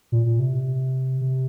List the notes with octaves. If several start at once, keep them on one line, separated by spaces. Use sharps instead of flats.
A#2
A#2
C3
C3